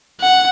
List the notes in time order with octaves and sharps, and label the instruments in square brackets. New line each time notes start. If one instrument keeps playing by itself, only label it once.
[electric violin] F#5